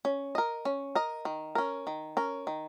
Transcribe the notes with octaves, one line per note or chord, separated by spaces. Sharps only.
C#4
A#4 D#5
C#4
A#4 D#5
D#3
C#4 A#4
D#3
C#4 A#4
D#3